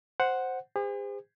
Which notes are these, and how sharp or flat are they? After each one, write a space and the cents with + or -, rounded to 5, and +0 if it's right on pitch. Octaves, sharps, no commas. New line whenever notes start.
C5 +0 F#5 +0
G#4 -45 C5 -30